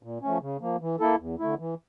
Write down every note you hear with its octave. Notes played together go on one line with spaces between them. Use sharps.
A#2
F3 A3 C#4
C#3
F3 A#3
E3
A#3 E4 A4
E2
D3 A3 E4
E3